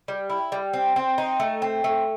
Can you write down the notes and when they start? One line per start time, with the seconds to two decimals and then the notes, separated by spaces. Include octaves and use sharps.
0.08 G3
0.30 E4
0.52 G3
0.74 C4
0.96 C4
1.18 D#4
1.40 A3
1.62 C4
1.84 A3